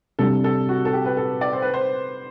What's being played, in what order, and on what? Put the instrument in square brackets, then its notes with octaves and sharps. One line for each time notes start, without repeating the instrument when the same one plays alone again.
[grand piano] C3 G3 D4 [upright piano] A4
[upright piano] A4
F#4
A4
G4
B4
A4
D5
C5
B4
C5